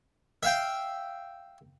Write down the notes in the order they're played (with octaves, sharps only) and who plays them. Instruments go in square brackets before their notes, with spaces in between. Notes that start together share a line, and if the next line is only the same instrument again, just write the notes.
[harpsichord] E5 F5 G5